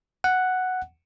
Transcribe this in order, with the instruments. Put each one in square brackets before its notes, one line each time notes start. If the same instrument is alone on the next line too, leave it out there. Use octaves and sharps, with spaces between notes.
[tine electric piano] F#5